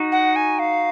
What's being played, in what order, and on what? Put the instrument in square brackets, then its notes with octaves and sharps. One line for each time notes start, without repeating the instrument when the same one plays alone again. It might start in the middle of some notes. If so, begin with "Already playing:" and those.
Already playing: [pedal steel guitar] D#4 F#4
[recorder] F#5
G#5
F5